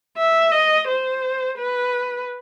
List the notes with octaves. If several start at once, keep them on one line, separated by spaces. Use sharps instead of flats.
E5
D#5
C5
B4